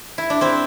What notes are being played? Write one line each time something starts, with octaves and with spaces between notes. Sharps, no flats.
E4
D4
C4 E4